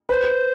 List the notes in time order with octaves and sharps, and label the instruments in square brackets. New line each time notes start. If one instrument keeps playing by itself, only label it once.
[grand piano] B4 [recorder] C5